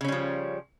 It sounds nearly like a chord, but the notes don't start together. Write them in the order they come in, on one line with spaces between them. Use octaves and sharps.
C#3 C#4 G3 F3